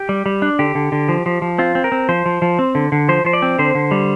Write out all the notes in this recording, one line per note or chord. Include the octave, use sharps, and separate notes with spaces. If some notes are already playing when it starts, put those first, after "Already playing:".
Already playing: G4
G3
G3
D4
D3 G4
D3
D3
F3
F3
F3
C4 F4
C4
A#4
C4
F3 C5
F3
F3
C4
D3
D3
F3 C5
F3 C5
D5
C4
D3 C5
D3
G3